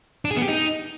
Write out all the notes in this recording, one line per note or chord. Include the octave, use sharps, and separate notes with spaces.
D4
G#4
B3
G4
D#4